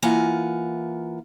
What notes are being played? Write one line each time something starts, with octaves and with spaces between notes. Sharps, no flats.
E3 A#3 F4 F#5 G#5